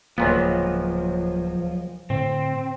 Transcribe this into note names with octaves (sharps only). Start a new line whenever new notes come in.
D1 C#2 A#2 F3 F#3 A#3 B3
A2 D3 C4